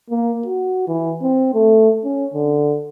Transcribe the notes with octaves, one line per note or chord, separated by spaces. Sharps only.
A#3
F#4
E3
C4
A3
C#4
D3